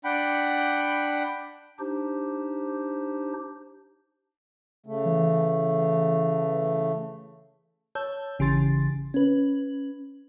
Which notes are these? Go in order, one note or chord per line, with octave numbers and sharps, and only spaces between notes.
D4 F#5 G5 B5
D4 D#4 G4 C5
C#3 A3
E3
C#5 A5 E6 G6
G#1 C#3 E3 G4 C6 A6
C#4 B4